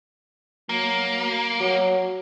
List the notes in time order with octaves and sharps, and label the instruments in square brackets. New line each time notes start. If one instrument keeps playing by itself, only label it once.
[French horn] F#3 [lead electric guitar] A#3
[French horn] F#3